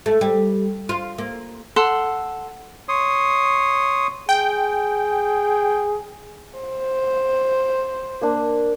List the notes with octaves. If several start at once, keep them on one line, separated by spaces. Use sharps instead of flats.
A3
G3
F4
A#3
A4 F#5 C6
C#5 C6 D#6
G#4 G5
C5
A#3 D4